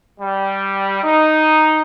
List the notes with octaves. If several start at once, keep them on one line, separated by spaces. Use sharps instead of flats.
G3
D#4